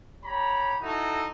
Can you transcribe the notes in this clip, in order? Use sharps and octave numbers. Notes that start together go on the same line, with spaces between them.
G4 C#5 A#5 B5
D#4 E4 F#4 A4